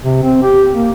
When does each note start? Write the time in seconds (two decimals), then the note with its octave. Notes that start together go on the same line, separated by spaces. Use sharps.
0.04 C3
0.23 C4
0.43 G4
0.74 A#3